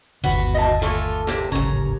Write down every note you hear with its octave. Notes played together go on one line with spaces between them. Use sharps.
G1 D#2 D3 B3 F#4 B4
D#5 E5 A5
A3 A#3 F4 A4 G#5
E2 C3 A#3
D1 G#1 D#2 C#3 C#4 A#5